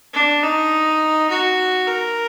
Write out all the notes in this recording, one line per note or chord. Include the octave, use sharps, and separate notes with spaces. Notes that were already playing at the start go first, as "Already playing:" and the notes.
D4
D#4
F#4
A#4